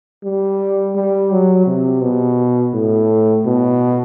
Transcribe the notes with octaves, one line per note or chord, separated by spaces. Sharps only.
G3
G3
F#3
C3
B2
A2
B2